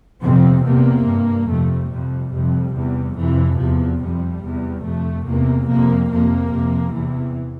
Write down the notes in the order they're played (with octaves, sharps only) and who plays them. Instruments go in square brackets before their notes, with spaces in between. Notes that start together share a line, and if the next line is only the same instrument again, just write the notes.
[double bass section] F2 C3 C4
E2 C3 A#3
G2
F2 C3 A3
F2 C3 G3
F2 C3
E2 C3
F2 C3 E3
E2 C3 F3
F2 C3 G3
E2 C3
F2 C3 A3
E2 C3 A#3
F2 C3 A#3
F2 C3 A#3
F2 C3
E2 C3 E3